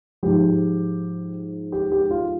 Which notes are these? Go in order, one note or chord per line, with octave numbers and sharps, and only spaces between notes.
G#2 F3 G4
G4
G4
F4